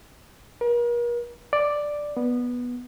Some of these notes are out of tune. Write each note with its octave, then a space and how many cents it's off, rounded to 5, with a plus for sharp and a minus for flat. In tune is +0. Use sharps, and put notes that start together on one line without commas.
A#4 +40
D5 +5
B3 -10